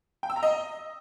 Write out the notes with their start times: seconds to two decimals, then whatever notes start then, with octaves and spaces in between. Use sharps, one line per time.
0.23 G5
0.30 E6
0.36 A#5
0.43 D#5